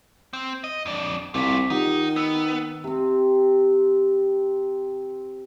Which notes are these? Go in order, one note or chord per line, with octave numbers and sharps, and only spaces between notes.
C4
D#5
F2 D4
C2 A3 F4 D6 B6
D#3 D#4 F4 G4 F#5
B3 E6
C3 C4